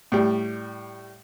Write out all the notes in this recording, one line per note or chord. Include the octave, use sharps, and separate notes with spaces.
A2 G3